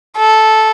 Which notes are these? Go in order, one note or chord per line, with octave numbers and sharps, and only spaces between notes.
A4